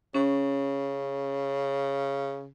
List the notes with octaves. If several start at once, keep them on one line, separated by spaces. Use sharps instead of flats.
C#3 C#4